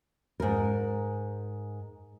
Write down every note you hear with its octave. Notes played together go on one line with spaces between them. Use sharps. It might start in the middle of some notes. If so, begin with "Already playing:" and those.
G#2 A#4